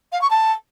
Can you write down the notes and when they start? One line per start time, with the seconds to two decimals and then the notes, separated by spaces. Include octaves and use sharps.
0.12 F5
0.21 C#6
0.31 A5